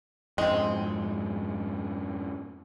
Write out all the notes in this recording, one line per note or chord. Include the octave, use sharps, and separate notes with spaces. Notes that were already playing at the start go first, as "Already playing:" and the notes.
F2 G#2 G#3 C4